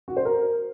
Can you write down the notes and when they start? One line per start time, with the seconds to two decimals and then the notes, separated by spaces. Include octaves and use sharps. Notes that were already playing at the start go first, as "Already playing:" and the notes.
0.08 F#4
0.17 C5
0.25 A#4